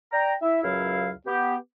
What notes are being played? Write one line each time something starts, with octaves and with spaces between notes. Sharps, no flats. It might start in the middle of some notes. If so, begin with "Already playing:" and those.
D5 G5 A#5
E4 E5
C#2 F#2 F#3 E4 F5
B3 G4